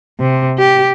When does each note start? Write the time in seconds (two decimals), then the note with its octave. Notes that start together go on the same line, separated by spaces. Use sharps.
0.20 C3
0.58 G4